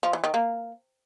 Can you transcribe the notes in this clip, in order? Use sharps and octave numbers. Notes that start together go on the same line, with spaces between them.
F3
E3
D#3
A#3